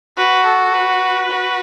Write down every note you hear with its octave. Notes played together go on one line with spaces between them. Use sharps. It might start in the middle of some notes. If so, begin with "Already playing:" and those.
F#4 B4
A4
B4
F#4